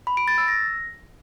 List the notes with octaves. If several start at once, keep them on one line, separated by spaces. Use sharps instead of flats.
B5
D7
A6
E6
A#6